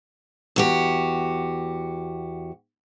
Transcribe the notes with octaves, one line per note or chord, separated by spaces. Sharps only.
E2 F#4 G4